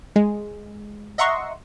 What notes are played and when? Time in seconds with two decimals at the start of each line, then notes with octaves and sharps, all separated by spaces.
0.16 G#3
1.18 D#5 E5 F#5 A#5 C6 C#6